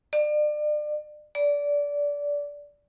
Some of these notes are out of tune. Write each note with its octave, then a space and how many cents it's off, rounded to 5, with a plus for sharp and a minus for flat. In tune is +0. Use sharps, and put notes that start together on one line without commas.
D5 +35
D5 -20